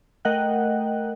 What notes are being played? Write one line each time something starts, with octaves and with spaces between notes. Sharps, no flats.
A3 A#4 D#5 F#5 G5 F#6